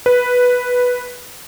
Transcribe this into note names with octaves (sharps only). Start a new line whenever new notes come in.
B4